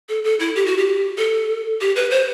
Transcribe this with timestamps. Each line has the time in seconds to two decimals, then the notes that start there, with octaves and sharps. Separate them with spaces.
0.09 A4
0.24 A4
0.40 E4
0.56 G4
0.66 F#4
0.78 G4
1.18 A4
1.81 G4
1.96 B4
2.11 C5